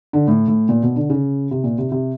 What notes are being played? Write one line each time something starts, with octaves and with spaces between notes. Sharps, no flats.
D3
A2
A2
A#2
B2
D3
C#3
C3
A#2
C3
C3